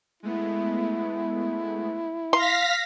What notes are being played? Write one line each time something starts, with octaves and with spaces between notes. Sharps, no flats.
G#3 A3 B3 E4
F5 C6 A#6 B6